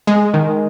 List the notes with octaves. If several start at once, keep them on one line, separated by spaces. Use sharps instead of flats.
G#3
D#3